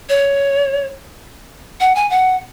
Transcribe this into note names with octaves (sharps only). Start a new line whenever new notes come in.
C#5
F#5
G#5
F#5